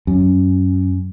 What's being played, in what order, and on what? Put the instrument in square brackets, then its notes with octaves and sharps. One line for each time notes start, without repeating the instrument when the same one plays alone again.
[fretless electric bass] F#2